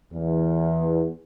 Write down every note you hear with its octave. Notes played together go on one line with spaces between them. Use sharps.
E2